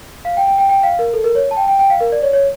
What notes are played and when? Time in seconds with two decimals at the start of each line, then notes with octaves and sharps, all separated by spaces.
0.25 F5
0.37 G5
0.47 G5
0.58 G5
0.69 G5
0.83 F5
0.99 A#4
1.14 A4
1.24 A#4
1.35 C#5
1.51 A5
1.57 G5
1.68 G5
1.79 G5
1.90 F5
2.01 A#4
2.12 D5
2.22 C#5
2.33 C#5